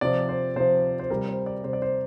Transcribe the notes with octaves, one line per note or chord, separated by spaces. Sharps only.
C3 F3 D5
C5
C3 F3 C5
C5
C3 G3 A#4
C5
D5
C3 G3 C5
D5
C5